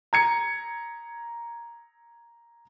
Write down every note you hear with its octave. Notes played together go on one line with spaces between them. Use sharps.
A#5 G#6 C#7